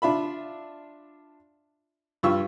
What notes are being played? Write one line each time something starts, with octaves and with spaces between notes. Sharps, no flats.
D4 F4 E5 B5
G2 F4 C#6 E6